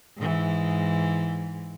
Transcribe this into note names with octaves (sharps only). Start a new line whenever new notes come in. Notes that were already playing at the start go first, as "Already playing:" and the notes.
G#2 E3